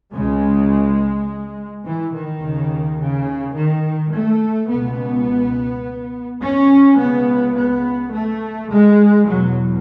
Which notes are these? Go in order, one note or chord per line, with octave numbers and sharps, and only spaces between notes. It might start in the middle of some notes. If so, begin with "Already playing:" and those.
C#2 C#3 G#3
E3
D#3
D#2 C#3
C#3
D#3
A3
C#2 B2 B3
C#4
C#2 C#3 B3
B3
A3
G#3
E2 B2 F#3